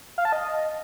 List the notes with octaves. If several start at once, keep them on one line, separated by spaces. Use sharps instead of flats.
F5
A5
D#5